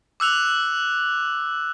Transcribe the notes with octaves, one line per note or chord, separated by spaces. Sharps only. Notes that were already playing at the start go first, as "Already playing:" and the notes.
D6 E6 F#6 F7